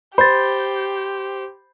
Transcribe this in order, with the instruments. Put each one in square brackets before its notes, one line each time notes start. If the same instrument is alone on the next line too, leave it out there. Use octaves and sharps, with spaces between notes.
[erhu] G4 [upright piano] C5 [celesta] B5 A6